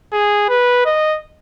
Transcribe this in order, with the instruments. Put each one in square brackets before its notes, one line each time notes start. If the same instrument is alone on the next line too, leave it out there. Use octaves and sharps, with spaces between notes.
[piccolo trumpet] G#4
B4
D#5